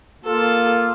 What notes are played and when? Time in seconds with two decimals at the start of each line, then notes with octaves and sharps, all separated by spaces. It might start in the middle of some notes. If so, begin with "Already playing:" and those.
0.24 A#3 F4 A4